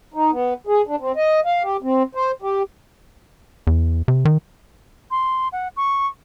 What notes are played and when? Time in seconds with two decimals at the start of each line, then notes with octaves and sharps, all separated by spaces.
0.14 D#4
0.32 B3
0.67 G#4
0.87 D4
1.00 C4
1.16 D#5
1.45 F5
1.63 G4
1.82 C4
2.15 C5
2.42 G4
3.67 E2
4.08 C3
4.25 D#3
5.11 C6
5.52 F#5
5.77 C#6